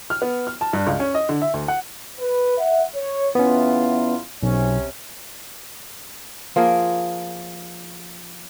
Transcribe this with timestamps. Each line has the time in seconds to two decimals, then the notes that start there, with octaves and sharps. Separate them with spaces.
0.10 F6
0.22 B3
0.47 F6
0.61 A5
0.73 G2
0.87 C#2
1.00 C#4
1.14 D#5
1.29 D3
1.42 E5
1.54 D2
1.68 F#5
2.20 B4
2.58 E5 F#5
2.95 C#5
3.35 E2 B3 C#4 E4 F4
4.43 B1 C3 C#4
6.56 F3 A#3 G#4 A#4